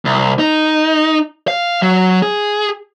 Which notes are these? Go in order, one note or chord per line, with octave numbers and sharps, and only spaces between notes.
C2
D#4
F5
F#3
G#4